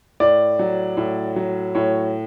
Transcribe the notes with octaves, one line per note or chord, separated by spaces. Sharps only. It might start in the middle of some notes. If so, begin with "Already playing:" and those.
A2 D5
F#3
A2
F#3
A2 C#5